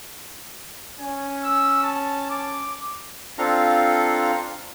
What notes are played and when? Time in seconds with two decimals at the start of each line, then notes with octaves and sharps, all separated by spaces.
0.99 C#4 G#5
1.44 E6
1.84 A5
2.30 D6
3.38 C4 D4 F4 A4 F5 A#5